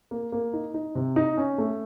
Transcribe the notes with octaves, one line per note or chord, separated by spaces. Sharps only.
A#3
A#3
D#4
D#4
C3
D#4
C#4
A3